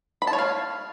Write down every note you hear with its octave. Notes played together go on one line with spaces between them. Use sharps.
B5
A5
C#5
F5